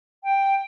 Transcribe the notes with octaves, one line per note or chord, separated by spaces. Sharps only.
G5